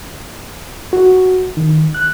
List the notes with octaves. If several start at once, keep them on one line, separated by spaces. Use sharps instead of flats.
F#4
D#3
F#6